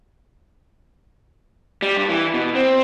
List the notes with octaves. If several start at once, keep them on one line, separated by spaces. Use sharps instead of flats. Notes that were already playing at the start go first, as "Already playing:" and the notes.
G3
G2
E3
B2
C4